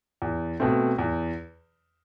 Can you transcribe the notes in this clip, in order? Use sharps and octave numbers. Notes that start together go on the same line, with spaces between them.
E2
B2 A3 C4
E2